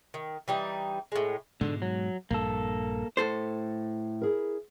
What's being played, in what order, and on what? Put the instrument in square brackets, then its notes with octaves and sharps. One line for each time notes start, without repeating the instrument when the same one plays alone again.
[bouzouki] D#3
E3 G3 D#4
A2 G#3
[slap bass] G#2 B2 G#3 [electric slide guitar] D3
[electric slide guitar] F#3
[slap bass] A#1 G2 [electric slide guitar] A#3 A4
[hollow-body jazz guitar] A2 A4 C5
[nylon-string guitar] E4 G#4 A#4